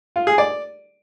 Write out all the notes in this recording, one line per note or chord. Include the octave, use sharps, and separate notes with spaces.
F4
G#4
D5